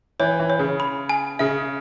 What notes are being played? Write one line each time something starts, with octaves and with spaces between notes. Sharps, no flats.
E3 C#5
E3
C#5
C#3
B5
G#5
C#3 E5